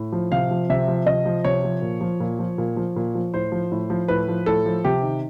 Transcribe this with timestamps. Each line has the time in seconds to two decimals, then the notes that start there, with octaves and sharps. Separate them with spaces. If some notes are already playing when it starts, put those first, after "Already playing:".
Already playing: A2
0.13 F3
0.32 C3 F5
0.51 F3
0.70 C3 E5
0.88 F3
1.06 C3 D#5
1.26 F3
1.45 C3 C#5
1.64 F3
1.82 A#2
2.01 F3
2.20 A#2
2.39 F3
2.58 A#2
2.77 F3
2.96 A#2
3.15 F3
3.34 A2 C5
3.52 F3
3.72 A2
3.90 F3
4.08 A2 B4
4.28 F3
4.46 A2 A4
4.66 F3
4.84 C3 G4
5.03 D#3